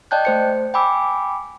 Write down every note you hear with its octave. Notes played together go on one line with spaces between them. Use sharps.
D5 D#5 G5 A5 F#6 G6
A3 C5 C#7
G5 G#5 B5 D6 E6